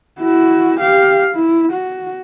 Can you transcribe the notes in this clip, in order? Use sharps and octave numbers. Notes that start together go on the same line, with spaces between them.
E4 F#4
G4 F5
E4
F#4